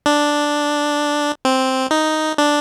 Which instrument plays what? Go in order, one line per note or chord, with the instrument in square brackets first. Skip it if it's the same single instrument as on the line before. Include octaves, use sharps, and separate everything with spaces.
[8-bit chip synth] D4
C4
D#4
D4